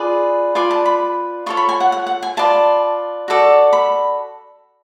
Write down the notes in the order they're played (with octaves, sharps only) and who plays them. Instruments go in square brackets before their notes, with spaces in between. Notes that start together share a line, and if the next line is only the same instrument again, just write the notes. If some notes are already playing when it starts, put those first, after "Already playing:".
Already playing: [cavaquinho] F4 G#4 B4 D5
F4 B4 D5 G#5
A5
B5
F4 A4 C#5 C#6
B5
G#5
F#5
F#5
F#5
G#5
F4 B4 D5 A5
F#4 A4 D5
B5